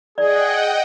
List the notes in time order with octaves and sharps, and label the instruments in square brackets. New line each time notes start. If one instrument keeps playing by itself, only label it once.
[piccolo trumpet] G#4 [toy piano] D5 [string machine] D#5 F#5 G5